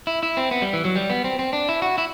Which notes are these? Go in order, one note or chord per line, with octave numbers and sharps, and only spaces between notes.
E4
E4
C4
B3
G3
E3
F#3
G3
B3
C4
C4
D4
E4
F#4
E4